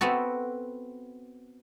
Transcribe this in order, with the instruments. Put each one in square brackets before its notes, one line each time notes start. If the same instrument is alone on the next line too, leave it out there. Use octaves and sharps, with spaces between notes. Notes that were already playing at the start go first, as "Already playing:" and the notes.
[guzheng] B3 C4 F#4 A4